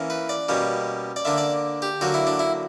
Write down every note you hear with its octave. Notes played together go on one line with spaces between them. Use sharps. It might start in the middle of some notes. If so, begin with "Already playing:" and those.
Already playing: E3 A#3 C#4
B4
D5
B2 G3 A#3 C#4
D5
D3 A#3 D4 E5
D5
G4
D3 F#3 A#3 F#4
E4
D4
E4